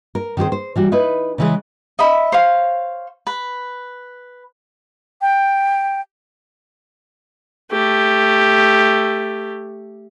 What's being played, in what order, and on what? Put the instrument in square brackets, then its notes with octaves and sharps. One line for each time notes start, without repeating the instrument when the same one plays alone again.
[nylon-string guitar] A#4
D#3 C4 G4 G#4 C5
C5
E3 G3 F#4
D#4 E4 B4
C#3 E3 G#3
[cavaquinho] D#5 E5 B5
C5 C#5 F5
B4
[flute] G5
[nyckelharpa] A3 G4